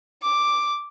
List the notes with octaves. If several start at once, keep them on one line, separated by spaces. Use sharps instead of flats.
D6